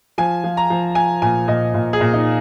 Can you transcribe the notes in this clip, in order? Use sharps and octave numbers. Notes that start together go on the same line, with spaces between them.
F3 G#5
F3
A#5
F3
F3 G#5
A#2 G#5
A#2 D#5
A#2
G#4
A#2
D#4